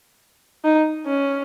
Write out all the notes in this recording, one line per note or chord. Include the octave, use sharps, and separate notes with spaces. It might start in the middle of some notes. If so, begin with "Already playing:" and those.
D#4
C#4